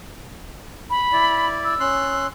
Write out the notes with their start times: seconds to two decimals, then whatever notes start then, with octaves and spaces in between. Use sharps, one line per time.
0.90 B5
1.13 E4 D5
1.64 E6
1.80 C#4 C6 F#6